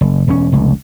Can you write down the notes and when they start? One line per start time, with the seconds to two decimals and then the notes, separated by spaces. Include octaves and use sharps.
0.01 F#1
0.28 E1 C#4
0.52 F1 C#2